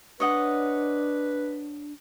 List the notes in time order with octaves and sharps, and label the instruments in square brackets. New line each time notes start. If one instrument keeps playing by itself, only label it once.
[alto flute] D4 [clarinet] B4 [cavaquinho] C#5 D#5 F#5